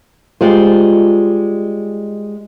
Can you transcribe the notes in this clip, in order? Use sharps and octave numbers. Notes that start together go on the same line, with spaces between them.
G3 G#3 F4 C5